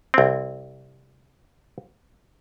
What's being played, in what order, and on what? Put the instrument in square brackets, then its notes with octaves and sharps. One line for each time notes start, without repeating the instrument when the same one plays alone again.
[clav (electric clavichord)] C2 C4